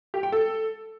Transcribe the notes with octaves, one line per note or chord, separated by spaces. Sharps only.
G4
G5
A4